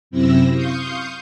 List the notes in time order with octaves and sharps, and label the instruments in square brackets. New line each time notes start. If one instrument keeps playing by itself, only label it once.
[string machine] F#2 C3 C4 E4 E6 A#6
F5 C6 C#6 D#6 G6